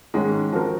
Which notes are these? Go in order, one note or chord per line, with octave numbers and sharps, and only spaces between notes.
G#2 D#3 G#3 C#4 G#4
F3 C4 F#4 A#4